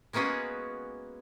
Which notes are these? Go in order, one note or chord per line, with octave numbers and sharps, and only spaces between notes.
G#3 A#3 B3 C#4 F#4 G#4